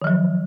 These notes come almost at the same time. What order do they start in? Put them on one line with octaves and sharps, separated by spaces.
D#3 F3 F#3